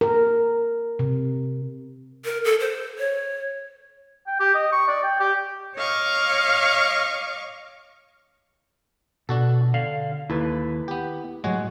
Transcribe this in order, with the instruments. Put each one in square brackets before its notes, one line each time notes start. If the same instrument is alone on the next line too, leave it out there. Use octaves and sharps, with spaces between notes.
[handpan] A#4
C3
[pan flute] A#4
A4
C5
C#5
[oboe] G5
G4
D#5
C#6
D5
G5
G4
[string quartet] C#5 D#5 F5 C#6 D6
[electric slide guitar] B2 [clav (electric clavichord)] D4 F#4 A4
[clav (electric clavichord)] D3 [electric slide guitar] F5
[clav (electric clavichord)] D#2 A4 [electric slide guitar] E4 B4
[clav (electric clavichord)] B3 G4
[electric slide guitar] A2 F#3 [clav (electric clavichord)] G#3 F#4 C#5